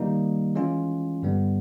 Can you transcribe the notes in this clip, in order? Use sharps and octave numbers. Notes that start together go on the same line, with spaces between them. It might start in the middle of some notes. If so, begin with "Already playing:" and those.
Already playing: D#3 G3 A#3 D#4
E3 G#3 C#4 F4
G2 D3 G3 B3